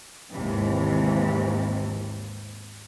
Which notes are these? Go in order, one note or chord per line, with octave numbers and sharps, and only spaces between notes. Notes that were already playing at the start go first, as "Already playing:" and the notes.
G#1 D#2 C3 E3